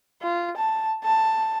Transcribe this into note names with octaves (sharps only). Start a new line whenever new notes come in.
F4
A5
A5